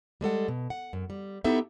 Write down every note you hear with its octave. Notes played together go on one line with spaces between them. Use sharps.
G3 G#3 A4 F#5
B2
F#5
F#2
G3
B3 D#4 E4 G4 A4 E5